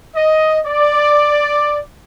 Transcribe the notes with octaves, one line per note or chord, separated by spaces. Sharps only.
D#5
D5